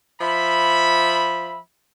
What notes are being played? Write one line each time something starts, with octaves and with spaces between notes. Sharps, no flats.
F3 E5 B5